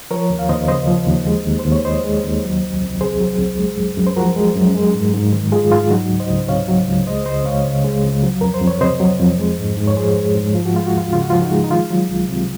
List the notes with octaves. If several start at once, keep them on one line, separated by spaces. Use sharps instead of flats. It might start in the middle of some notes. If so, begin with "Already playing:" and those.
F3 A#4 C#5
D#2
F5
D#2 C5 D#5
C#3 C5 D#5
F3
D#2
G#3
D#2
C5
D#2
C#5
D#3 C5 D#5
G#3
D#2
F#3
C2
C2
C3 G#4 C5
F#3
C2
G#3
F#2
F#2
C5
F3 F#4 A#4
G#3
F#2
G#3
G#2
G#2
D#3
G#3 F4 G#4
G#2 F4 G#4
F#3 D#4 F#4
C#2
C5 D#5
C#2
C3 C#5 F5
F#3
C#2
G#3 C5 D#5
C#2 C5 D#5
C#2 C#5 F5
C#3
G#3
C#2
F#3
F2 A#4
C5
F2
C#5
C3 C5 D#5
F#3
F2
G#3
G#2
G#2
C#5
F3 G#4 C5
G#3
G#2
F3 F4
F#4
G#3 F4
F#4
D#2 F4
C#3 F4
F#4
F3 F4
D#4 F#4
G#3
D#4
D#3 F4
F#3
C2
C3